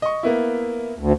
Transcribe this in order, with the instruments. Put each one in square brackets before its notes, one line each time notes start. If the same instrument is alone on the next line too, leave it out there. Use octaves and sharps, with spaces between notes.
[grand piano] D#5 C#6
A#3 B3 E4
[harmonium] D2